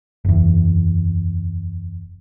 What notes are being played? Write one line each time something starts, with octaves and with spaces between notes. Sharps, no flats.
F#1 E2